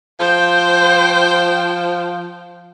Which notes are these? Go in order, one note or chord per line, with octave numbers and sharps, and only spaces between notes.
F3 C5 G5